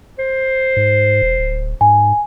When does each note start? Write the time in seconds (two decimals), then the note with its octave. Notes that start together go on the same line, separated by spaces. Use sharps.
0.19 C5
0.77 G#2
1.22 E1
1.39 D1
1.81 G#2 G#5